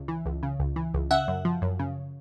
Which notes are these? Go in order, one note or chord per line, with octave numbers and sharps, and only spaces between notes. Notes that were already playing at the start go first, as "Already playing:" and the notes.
Already playing: C#2 C#3
E3
C#2
C#3
C#2
E3
C#2
C#3 E5 F#5
F#2
F3
F#2
C#3